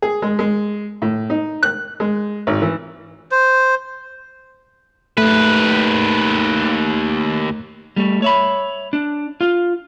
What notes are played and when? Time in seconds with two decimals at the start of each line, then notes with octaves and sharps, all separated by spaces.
0.02 G#4
0.22 G#3
0.39 G#3
1.02 A2
1.30 D#4
1.63 F#6
2.00 G#3
2.47 G#1
2.62 E3
3.31 C5
5.18 D#2 A3 B4
7.96 G3 A3
8.22 C#5 E5 B5
8.93 D4
9.41 F4